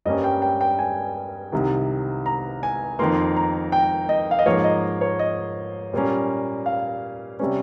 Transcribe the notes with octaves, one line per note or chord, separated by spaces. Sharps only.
G2 G3 A#3 C#4 D#5
G5
G5
G5
G#5
C2 C3 D#3
A#5
G#5
F2 D#3 A#3 C6
A#5
G5
D#5
F5
D#5
G#2 F3 A#3 C#5
D#5
C#5
D#5
A#2 G3 A#3 C#4
F5
C3 G3 C#4